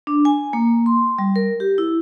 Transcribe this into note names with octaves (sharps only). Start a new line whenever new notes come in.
D4
G#5
A#3
C6
G3
A#4
G4
E4